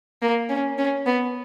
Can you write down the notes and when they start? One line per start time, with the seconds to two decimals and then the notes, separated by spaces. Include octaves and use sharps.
0.22 A#3
0.49 C#4
0.78 C#4
1.06 B3